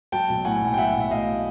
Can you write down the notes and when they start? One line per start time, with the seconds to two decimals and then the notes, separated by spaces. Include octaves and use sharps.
0.12 F#3 G5 A5
0.29 B1
0.45 A2 F#5 G#5
0.62 B1
0.74 G5
0.78 F#3 E5 F#5
0.94 B1
1.00 E5
1.11 A2 D#5 F5